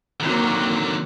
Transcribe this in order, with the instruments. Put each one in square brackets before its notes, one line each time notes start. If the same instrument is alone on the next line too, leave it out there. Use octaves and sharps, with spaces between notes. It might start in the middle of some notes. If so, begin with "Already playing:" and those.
[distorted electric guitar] D3 D#3 [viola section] F#3 A#3 C4